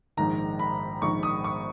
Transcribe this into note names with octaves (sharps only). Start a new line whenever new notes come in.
A#1 G#2 D#3 A#5
B5
A#1 G#2 D#3 C#6
D#6
C#6